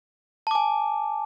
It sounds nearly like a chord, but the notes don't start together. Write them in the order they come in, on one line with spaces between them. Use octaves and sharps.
A5 D6 G#5